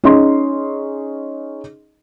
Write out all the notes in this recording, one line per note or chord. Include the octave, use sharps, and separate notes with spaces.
C#4 D#4 G#4 D#5 C6